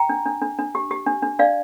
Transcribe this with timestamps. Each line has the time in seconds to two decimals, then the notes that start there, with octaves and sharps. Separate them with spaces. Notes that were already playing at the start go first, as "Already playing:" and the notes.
Already playing: G5 A#5
0.09 D4
0.26 D4
0.41 D4
0.59 D4
0.75 G4
0.91 G4
1.06 D4
1.23 D4
1.39 D4 D5 F5